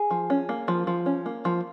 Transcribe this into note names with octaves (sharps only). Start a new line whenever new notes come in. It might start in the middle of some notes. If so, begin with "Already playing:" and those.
Already playing: G#4
F3
C#4
A#3
F3
F3
C#4
A#3
F3